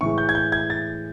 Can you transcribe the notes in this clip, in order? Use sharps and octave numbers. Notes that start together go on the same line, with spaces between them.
A2 E3 G#3 C#6
G6
G#6
G6
G#6
A6